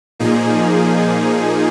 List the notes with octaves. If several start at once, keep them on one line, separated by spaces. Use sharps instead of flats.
A#2 F3 A#3 D#4 G#4